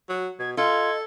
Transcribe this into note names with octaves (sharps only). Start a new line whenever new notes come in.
F#3
B2 G#6
F4 A4 D#5 G#6